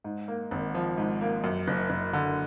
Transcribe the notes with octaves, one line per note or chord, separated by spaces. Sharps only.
G#2
A#3
G#1
F3
G#2
A#3
F#2
F#1
F#1
D3